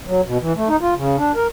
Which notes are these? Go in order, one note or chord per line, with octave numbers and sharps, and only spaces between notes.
F#3
B2
E3
A3
D#4
F4
C#3
D4
A#4